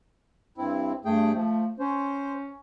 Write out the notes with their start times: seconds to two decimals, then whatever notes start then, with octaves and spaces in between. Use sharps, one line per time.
0.58 G2 C4 E4
1.05 G2 A3 G#4 G5
1.34 F3 A3
1.79 C#4 C5